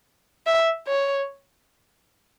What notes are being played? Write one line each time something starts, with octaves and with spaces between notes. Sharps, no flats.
E5
C#5